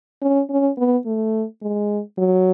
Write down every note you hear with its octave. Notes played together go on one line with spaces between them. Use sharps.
C#4
C#4
B3
A3
G#3
F#3